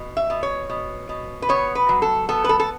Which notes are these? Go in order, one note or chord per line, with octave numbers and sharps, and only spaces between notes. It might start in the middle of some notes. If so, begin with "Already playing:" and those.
Already playing: B2
E5
B2
C#5
B2
B2
B4
B3 C#5
B4
F#3
A4
B3 A4
B4
A4
A4